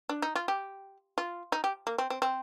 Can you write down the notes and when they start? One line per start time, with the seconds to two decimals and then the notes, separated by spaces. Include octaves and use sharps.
0.09 D4
0.22 D#4
0.35 F4
0.48 G4
1.18 F4
1.52 D#4
1.64 G4
1.87 A#3
1.98 C4
2.10 C4
2.22 C4